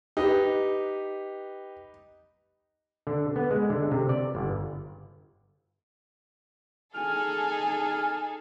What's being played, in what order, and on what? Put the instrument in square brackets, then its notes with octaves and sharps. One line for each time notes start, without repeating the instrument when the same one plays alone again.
[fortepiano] D#4 [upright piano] G4 B4
[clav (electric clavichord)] D3
B3
G#3
D3
C3
D5
G1
[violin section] D#4 G#4 A4 [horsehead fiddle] G#5 [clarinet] F6